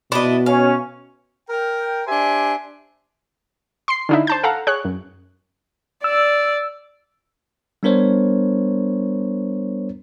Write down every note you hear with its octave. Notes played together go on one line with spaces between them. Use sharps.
B2 D4 E4 D#5
C#4 F5
A#4 G5
D4 G4 C5 E5 G#5
C6 C7
D3 D#4 E4
C5 A5 G6
A4 F5 F#5 A#5
G#4 C#5 F#6
F#2
D5 E6
G3 B3 D4 A#4 C5 C#5